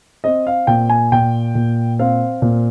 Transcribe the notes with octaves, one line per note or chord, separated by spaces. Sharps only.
C4 D#5
F5
A#2 G5
G#5
A#2 G5
A#2
C4 F5
A#2